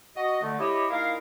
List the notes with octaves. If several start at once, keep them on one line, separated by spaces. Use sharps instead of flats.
F#4 D#5
D3 A3
E4 G4 C#5 D#5
A#2 D#4 E4 A#4 F5